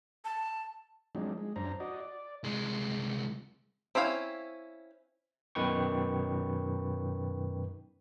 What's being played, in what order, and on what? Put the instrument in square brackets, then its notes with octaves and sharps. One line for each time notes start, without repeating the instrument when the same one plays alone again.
[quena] A5
[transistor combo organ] F3 F#3 G#3 C4 D4 D#4
G#3
F#2 D4 C5 A#5
F#4 D5 D#5
D5
[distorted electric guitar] C2 G#3
[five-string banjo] C4 C#4 E4 F5 G5
[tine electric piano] F#2 B2 D#3 B4 G5 C#6